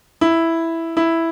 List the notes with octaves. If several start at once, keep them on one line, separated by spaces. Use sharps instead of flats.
E4
E4